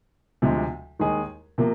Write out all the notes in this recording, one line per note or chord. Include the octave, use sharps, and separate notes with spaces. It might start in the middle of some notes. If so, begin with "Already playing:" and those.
D2 C3 F3 G#3
D#2 D#3 G#3 D#4 G#4
C3 F3 A#3